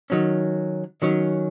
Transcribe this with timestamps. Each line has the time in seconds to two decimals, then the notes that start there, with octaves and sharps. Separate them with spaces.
0.10 D#3 F#3 C#4
1.02 D#3 F#3 C#4